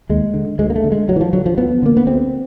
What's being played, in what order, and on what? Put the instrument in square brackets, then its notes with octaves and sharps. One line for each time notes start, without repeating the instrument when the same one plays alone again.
[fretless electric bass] D#2 G#3
D3
D2 G#3
A#3
A3
D3
G#3
D2 F#3
E3
F3
D3 F#3
F3
D2 B3
D3 A#3
B3
D2 C4